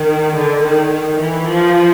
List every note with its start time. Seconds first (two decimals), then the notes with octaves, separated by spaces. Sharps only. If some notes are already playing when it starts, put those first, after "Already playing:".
Already playing: D#3
0.35 D3
0.63 D#3
0.91 D#3
1.20 E3
1.47 F3